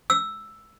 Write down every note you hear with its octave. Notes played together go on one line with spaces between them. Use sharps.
E6